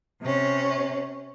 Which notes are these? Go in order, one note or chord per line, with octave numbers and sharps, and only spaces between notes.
C3 C#4